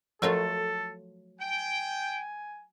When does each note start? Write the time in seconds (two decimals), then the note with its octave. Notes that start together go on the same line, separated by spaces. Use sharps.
0.22 F3 F#3 A3 F4 A4 A#4 E5
1.39 G5 G#5